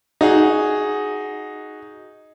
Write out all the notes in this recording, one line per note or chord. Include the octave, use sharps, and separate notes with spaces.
D#4 F#4 G#4